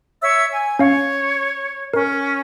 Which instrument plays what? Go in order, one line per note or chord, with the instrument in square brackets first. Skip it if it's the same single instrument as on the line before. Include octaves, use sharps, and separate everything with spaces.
[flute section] C#5 E5 E6
G#5
[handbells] C#4 F5 [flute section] C#5
[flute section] C#4 [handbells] A#4